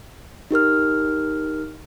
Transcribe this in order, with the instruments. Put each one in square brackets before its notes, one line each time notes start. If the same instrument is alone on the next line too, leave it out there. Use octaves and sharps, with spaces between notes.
[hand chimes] D#4 G4 A#4 F6